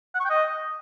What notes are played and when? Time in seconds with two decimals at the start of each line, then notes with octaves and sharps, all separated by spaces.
0.15 F#5
0.20 C#6
0.25 G5
0.30 D#5